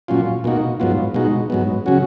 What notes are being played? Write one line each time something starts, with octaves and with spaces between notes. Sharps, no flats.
A#2 F#3 C#4 F4
B2 A#3 D#4 F#4
G#2 F#3 B3 F4
B2 G#3 D#4 F#4
G#2 F#3 B3
C#3 F#3 C#4 F#4